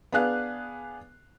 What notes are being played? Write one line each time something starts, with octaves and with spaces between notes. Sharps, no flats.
B3 D4 G#4 F5 F#6